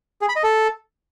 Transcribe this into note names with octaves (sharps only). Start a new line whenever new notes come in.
G#4
B5
D#5
A4